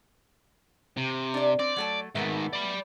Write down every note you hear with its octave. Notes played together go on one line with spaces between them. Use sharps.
C3
D4 D5
C4 D5
F#3 A3 A5
G#2 D#3 A3 B3 E5
D5 B5